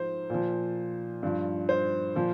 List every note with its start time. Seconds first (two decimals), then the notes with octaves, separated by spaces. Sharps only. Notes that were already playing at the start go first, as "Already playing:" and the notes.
Already playing: G#2 F3 C5
0.30 A#2 F3
1.23 G2 F3
1.69 C5
2.15 A#2 F3